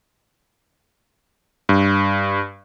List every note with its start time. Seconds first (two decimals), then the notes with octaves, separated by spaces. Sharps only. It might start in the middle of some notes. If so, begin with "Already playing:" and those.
1.69 G2